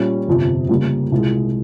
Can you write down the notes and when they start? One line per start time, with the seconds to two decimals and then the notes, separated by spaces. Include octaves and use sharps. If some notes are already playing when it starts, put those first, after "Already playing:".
Already playing: A#2 G3 C#4
0.28 G1 F2 C3
0.69 C#3 G3 A#3 F4
1.12 C2 A#2 G#3